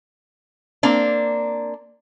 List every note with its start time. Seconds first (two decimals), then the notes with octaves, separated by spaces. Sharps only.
0.83 A#3 C4 D4